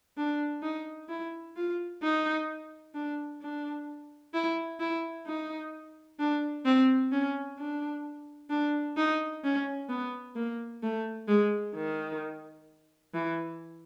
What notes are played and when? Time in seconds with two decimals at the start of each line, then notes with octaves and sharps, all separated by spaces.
0.17 D4
0.62 D#4
1.09 E4
1.56 F4
2.03 D#4
2.94 D4
3.41 D4
4.34 E4
4.80 E4
5.27 D#4
6.19 D4
6.65 C4
7.12 C#4
7.58 D4
8.50 D4
8.97 D#4
9.43 C#4
9.89 B3
10.35 A#3
10.83 A3
11.28 G#3
11.75 D#3
13.14 E3